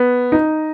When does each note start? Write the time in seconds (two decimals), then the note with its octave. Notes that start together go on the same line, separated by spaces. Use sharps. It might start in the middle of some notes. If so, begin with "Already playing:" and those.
Already playing: B3
0.32 D#4